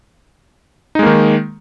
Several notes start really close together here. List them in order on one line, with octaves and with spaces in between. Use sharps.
D#4 G#3 A#3 D#3